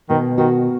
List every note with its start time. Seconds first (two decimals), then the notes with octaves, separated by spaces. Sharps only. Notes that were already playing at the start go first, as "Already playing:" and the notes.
0.10 B2 D#3
0.38 D#3 F#4